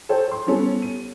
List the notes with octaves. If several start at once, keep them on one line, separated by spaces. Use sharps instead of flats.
A4 C5 C#5 G5
C6
G3 B3 C#4 A4
D#7